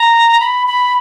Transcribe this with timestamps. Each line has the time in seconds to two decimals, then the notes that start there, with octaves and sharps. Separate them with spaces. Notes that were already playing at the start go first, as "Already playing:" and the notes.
Already playing: A#5
0.40 B5
0.67 B5